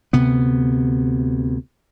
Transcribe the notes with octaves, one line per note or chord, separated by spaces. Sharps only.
D2 C3 B3